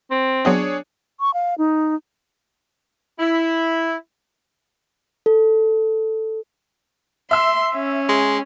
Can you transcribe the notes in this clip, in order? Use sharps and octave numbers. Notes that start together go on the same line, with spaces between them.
C4
F#3 B3 D4 G#4 C#5 D#5
C#6
F5
D#4
E4
A4
E5 C6 E6
C#4
G#3